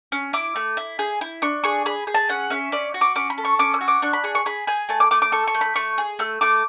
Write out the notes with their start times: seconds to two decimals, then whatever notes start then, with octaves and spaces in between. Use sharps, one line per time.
0.12 C#4
0.33 E4 D6
0.56 A3
0.77 E4
0.99 G#4
1.21 E4
1.42 D4 C#6
1.64 G#4 C#6
1.86 G#4 B5
2.07 G#4
2.14 A5
2.29 C#4 F#5
2.50 C#4 E5
2.72 C#4 D5
2.94 F#4
3.01 D6
3.15 C#4 D6
3.30 B5
3.38 A4
3.45 C#6
3.59 C#4 D6
3.74 E6
3.81 F#4
3.88 D6
4.02 D4 C#6
4.13 B5
4.24 G#4 C#6
4.35 C#6
4.46 G#4 B5
4.67 G#4 G#5
4.89 A3 A5
5.00 D6
5.11 A3 D6
5.22 D6
5.32 A4 C#6
5.47 C#6
5.55 A3
5.61 B5
5.76 A3 C#6
5.98 G#4
6.19 A3 E6
6.41 A3 D6